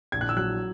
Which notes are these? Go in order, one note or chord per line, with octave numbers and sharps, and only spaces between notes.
A#1 G#6
F#6
E6
F#3 F#6